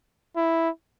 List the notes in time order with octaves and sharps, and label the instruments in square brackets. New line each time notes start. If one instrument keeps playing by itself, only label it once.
[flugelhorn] E4